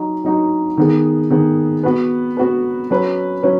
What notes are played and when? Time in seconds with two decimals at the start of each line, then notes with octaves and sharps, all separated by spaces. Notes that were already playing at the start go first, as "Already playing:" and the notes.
Already playing: F#3 D#4 F#4
0.24 F#3 D#4 F#4
0.77 D#3 B3 G#4
1.30 D#3 B3 G#4
1.83 B3 F#4 B4
2.37 B3 F#4 B4
2.90 F#3 C#4 B4
3.43 F#3 C#4 B4